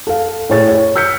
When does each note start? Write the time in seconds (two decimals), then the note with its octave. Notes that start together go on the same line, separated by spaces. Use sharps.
0.07 A4 F5
0.50 A2 G#4 C#5 A6
0.68 C#5
0.96 E6 F6 G6 B6 C#7